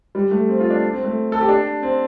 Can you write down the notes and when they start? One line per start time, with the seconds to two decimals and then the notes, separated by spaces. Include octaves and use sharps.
0.15 G3
0.31 A3
0.49 C4
0.60 F4
0.70 D4
0.93 C4
1.04 A3
1.32 A4
1.41 G4
1.49 D4
1.83 C4